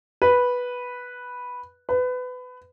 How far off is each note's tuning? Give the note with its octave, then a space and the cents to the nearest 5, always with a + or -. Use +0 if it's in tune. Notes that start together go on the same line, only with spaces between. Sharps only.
B4 -5
B4 +25